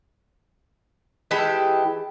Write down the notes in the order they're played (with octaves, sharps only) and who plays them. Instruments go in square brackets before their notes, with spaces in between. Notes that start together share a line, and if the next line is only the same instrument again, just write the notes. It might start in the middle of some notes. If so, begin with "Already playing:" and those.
[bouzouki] E3 G#3 G4 A4